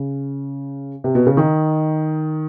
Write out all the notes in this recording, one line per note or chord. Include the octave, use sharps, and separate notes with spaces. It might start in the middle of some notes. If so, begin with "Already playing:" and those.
Already playing: C#3
C3
B2
C#3
D#3